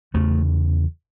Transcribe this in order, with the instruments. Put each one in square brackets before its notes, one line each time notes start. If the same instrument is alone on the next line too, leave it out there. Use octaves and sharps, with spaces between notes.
[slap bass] F1 E2 C#3 A3